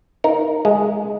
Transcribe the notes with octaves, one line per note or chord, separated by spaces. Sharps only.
D#4 A#4
G#3